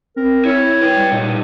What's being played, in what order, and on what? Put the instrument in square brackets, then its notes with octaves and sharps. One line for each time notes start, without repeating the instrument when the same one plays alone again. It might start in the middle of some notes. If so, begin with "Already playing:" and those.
[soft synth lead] C4 [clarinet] A#4
[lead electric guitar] E4 [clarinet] C#5
[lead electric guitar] B4 G5
[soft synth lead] G3
[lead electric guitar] G2 D#4 [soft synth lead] A#2